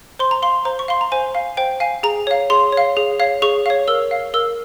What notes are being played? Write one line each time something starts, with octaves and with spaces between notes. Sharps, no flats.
C5 C6
A#5
F5 C6
C5 A#5
C#6
F5 C6
A#5
C5 G#5
F5
C5 G5
F5 G#5
G#4 A#5
C#5 F5
G#4 C6
C#5
F5
G#4
C#5 F5
G#4 C#6
C#5 F5
A#4 E6
F5
A#4 E6